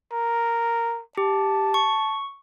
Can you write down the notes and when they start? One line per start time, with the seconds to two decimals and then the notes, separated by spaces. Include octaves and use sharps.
0.12 A#4
1.18 G4 A5
1.74 C#6